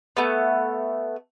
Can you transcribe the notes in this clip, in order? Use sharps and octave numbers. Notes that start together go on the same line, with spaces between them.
A3 B3